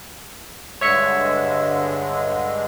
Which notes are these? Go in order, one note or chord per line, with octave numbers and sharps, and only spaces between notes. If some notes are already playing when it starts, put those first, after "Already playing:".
G2 D3 G#3 C#5 E5 C#7